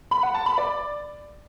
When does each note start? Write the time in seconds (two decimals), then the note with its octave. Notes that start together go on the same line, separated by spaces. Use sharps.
0.11 B5
0.23 F#5
0.35 A5
0.46 B5
0.58 D5